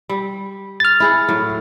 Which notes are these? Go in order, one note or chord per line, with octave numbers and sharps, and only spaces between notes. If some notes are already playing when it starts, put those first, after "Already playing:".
G3
F6 A6
E4 G#4 F#5
A2 F#3